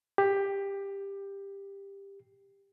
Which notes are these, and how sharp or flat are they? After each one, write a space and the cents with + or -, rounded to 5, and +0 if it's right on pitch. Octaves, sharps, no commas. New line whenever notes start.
G4 +15